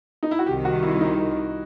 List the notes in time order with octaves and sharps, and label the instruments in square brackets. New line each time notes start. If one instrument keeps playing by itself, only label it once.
[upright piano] D#4
E4
F#4
[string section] C2 C3 D#3 [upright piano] G4
[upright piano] F#4
E4
D#4